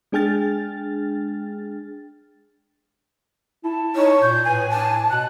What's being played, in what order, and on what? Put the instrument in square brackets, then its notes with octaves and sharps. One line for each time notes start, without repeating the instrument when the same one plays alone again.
[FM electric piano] G#3 D4 G#4 G5 F6 A6
[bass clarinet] E4 [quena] A5
[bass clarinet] D#4 [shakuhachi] C#5
[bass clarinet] A#2 [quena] G6
[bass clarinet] A2 [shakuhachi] B4 [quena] G#5
[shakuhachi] A5
[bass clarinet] B2 [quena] F#6